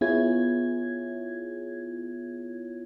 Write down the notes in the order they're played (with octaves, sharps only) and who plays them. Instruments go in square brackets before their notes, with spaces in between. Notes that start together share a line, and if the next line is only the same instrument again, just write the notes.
[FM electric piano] B3 E4 F4 G#4 C#5 G#6